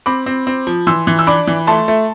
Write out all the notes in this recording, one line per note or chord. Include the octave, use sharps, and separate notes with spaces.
C4 B5 D6
C4
C4
F3
E3 C6 E6
E3
E6
D4 B5 D6
E3
A3 A5 C6
A3